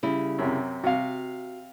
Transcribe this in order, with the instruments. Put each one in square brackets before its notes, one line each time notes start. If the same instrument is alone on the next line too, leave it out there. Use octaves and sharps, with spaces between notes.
[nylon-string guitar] C#3 G3 E4
[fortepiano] F#2 C3
[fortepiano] C3 F5 [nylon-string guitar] F#4